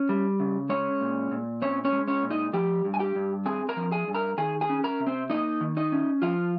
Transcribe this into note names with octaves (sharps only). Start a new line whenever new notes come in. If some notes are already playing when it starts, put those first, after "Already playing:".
Already playing: C#4
G3
C#3
G#3 C#4 C#5
A#2
A#2
C4 C#4 C#5
C#4 C#5
G#3
C#4 C#5
A#2
D#4 D#5
F3 G4 G5
G2
G#5
G4 G5
G2
C4 G#4 G#5
A#4 A#5
F3
G#4 G#5
G2
A#4 A#5
D#3 G#4 G#5
G#4 G#5
C#4
A#4 A#5
C3
C4 C5
A#3 D#4 D#5
D#3
D#4 D#5
C#4
F3 F4 F5